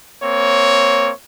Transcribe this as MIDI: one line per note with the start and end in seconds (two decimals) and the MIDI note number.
0.22 1.11 58
0.22 1.11 60
0.22 1.11 73